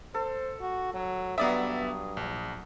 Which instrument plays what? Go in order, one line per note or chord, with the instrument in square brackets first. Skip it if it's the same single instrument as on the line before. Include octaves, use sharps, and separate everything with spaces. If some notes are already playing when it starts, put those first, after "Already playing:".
[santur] A4 [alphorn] C5
[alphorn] F#4
F#3
[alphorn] G2 [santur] F#3 D#6 [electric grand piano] B3 D5 E5
[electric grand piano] A#1